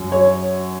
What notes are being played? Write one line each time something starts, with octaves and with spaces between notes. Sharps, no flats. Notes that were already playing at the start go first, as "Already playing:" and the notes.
Already playing: F#2 F#3
C#5